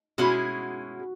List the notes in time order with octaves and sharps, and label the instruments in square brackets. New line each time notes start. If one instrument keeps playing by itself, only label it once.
[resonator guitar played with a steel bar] B2 G#3 C#4 E4 G#4 [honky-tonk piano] F#4